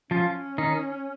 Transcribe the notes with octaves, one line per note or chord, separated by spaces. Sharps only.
F3 C#4 F4
D#3 D#4